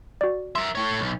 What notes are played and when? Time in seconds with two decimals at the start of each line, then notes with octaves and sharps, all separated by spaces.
0.21 F#4 D5
0.55 A#4 E5 C6
0.75 A3 C#5
0.99 B1